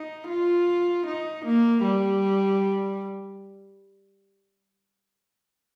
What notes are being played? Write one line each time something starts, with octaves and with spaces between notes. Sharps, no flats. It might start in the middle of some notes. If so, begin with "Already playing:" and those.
Already playing: D#4
F4
D#4
A#3
G3